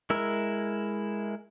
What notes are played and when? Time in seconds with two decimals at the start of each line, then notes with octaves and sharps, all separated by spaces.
0.10 G#3 E4 A#4 E6